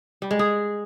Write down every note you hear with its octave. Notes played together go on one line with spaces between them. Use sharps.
G3
G#3
G#4